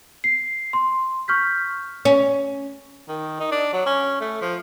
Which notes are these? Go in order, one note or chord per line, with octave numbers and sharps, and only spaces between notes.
C7
C6
C#6 F6 G6 B6
C#4
D#3
D#4
D4
F#3
C#4
A3
F3